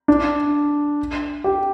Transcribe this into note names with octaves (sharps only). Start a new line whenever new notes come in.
D4
G4